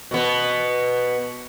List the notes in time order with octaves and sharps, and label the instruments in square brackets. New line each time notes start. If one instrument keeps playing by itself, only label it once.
[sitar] B2 B3